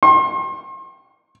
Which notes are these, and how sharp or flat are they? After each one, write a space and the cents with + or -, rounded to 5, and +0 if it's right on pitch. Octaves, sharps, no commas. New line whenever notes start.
C6 +40